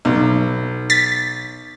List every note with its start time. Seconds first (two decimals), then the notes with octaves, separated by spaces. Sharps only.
0.05 B1
0.90 A6 B6